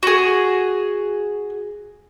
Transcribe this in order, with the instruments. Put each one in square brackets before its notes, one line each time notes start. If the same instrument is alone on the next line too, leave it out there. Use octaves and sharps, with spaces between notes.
[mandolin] F#4 G#4